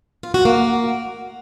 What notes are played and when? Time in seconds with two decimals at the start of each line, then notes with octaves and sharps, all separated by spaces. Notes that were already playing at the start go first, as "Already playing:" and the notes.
0.23 F4
0.34 F#4
0.45 A#3